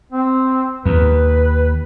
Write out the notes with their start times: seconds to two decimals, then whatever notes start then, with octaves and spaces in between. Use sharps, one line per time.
0.12 C4
0.86 D#2 B4